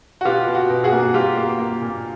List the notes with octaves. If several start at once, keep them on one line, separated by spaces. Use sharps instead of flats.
F#4
B2 F4 G4
B2
F#4
B2
F#4 G#4
A#3
G3 F4 G4
A#3
A#3
A#2